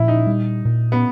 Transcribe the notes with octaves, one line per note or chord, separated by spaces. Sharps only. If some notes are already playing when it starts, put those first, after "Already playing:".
Already playing: A#2 F3 E4
D#4
G3
A#2
B3